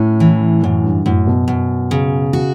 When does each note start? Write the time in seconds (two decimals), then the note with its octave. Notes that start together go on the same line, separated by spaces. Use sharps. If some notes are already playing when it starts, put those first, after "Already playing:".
Already playing: A2 C#4
0.20 E3
0.63 F#2 A2
0.84 G2
1.05 F#2 A2
1.27 B2
1.48 F#2
1.91 C#3
2.33 F#4